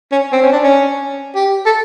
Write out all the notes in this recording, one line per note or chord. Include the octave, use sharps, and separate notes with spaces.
C#4
C4
C#4
D4
C#4
G4
A4